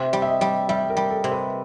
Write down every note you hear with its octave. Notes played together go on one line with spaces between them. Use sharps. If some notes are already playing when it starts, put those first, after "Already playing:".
Already playing: C3 E5
G3
E5
D#5
G3
G3 E5
A#4
G3
A4
C3
B4